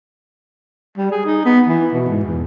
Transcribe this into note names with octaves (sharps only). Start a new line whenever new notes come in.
G3
G#4
D#4
B3
E3
B2
G#2
E2